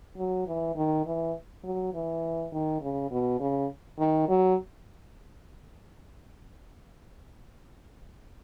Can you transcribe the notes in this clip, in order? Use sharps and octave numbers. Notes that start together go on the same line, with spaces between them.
F#3
E3
D#3
E3
F#3
E3
D#3
C#3
B2
C#3
D#3
F#3